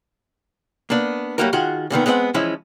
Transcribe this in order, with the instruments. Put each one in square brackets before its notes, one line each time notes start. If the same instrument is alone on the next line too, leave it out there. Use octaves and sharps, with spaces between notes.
[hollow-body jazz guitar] A#3 B3 D4
F#3 G3 A3 A#3 F#4 A#4
D#3 F4 F#4 G#4 F#5
A#2 D3 D#3 B3
G#3 B3 C4 D#5 F#5
E3 F3 G#3 C#4 E4